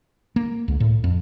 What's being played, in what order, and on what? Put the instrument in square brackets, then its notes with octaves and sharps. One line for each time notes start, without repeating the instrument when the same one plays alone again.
[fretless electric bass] A#3
C#2
A2
F2